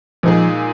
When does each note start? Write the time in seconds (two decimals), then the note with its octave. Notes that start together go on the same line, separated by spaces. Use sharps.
0.23 A#2 F3 G#3 D#4 G#4